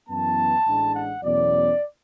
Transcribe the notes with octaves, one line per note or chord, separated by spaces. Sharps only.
F#2 E3 B3 A5
A1 A2 G#3 D4
F#5
E2 B2 F#3 A3 C#4 D5